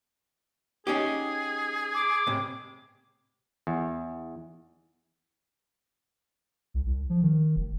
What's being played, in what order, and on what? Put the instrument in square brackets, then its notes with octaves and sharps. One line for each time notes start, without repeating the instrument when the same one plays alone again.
[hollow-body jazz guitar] C#4 D#4 G4 [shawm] G#4
[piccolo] D6
[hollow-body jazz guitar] A2 C3
[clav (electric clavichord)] E2
[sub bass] C2
C2
F3
D#3
F1